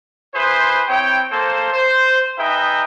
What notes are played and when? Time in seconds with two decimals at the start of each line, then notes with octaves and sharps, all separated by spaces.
0.35 E4 G#4 B4 C5
0.89 C4 E4 C#5 G5
1.30 A#3 A4 C5
1.72 C5
2.38 D#4 G#4 B4 E5 G5